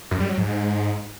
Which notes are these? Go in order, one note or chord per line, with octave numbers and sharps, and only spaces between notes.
F#2
G3
F#3
G#2